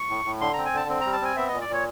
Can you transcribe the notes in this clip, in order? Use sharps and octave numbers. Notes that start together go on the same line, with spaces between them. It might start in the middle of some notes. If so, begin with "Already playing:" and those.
Already playing: C#6
A2
A2
D3 C6
C4 A#5
G#5
D3 A5
C4
G3 A#5
A5
C4 G#5
B3 E5
A#2 D#5
D5
A#2 C#5